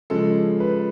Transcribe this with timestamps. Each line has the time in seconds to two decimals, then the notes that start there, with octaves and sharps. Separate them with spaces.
0.10 C#3 F3 G#3 A4
0.60 B4